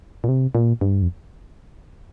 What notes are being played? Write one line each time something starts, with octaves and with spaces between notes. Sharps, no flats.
A#2
C3
A#2
G2
F2